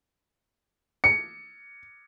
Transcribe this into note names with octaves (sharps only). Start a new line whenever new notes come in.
C#7